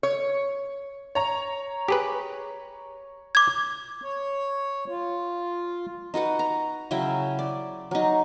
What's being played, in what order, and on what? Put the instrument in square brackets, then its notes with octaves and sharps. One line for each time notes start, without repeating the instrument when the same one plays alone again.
[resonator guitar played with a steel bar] C#5
[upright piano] C#5 A#5
[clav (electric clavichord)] G4 G#4 B4
[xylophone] D6 G#6
[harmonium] C#5
F4
[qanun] D#4 F#4 B4 F#5
A#5
C#3 F#3 E4 G5
D5
F#3 D#4